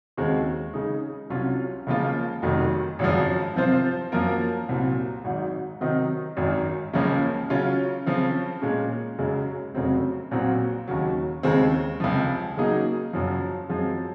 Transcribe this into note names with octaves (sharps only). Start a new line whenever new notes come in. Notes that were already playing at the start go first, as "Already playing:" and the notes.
D#2 C#3 G#3 C4 F#4
C#3 G#3 D#4
C2 C3 F#3 C#4 F4
C#2 C#3 F3 A#3 F4
F1 F2 D#3 F#3
G#1 F#2 C#3 F3
C3 F3 C4 F4 C5
F#2 F3 A#3 F4 A#4
C2 A#2 F#3 C4
G#1 G#2 F#3
C3 D#3 F#3 C4 D#4
G#1 F#2 D#3
C#2 C#3 F3 A#3 C#4
C#3 F#3 C#4 F4
C#3 F3 C4
A#2 G#3 C#4
F#1 F#2 C#3 G#3
F1 F2 C#3 F#3 C4
A#1 A#2 F#3 C4 F#4
D#2 C#3 F#3
D#2 C#3 G#3 C4
C#2 C3 F3
C#3 F#3 A#3 D#4 G#4
F#1 F#2 F3
F#2 F3 G#3 C4